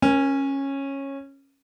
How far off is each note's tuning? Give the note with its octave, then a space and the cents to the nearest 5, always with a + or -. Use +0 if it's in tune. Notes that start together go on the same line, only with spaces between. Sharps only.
C#4 -15 A#4 +30